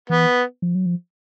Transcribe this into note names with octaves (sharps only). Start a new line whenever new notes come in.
E3 B3
F3
F#3
F3